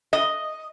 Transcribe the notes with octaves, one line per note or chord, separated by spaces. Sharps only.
D#5